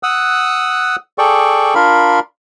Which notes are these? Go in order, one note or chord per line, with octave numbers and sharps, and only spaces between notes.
F#5 D#6 E6 F#6
G#4 A4 D5 G5 C#6
D4 F4 A#4 F5 B5